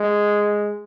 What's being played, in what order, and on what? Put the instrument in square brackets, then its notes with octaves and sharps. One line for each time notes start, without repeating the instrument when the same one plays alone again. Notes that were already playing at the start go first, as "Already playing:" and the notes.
Already playing: [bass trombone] G#3